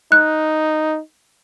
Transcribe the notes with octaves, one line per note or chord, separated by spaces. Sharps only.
D#4 F#6